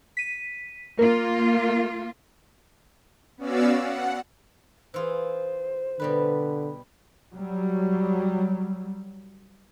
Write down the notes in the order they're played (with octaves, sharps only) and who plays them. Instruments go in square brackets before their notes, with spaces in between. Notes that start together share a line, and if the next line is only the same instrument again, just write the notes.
[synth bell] B6 D#7
[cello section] A#3 F4 [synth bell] A#4
[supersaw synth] B3 C#4 F#4 D5 F5 E6
F#5
[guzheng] E3 F4 G#4 [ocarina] C5
[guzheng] B2 G3 B4 [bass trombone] D3
[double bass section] F#3 G3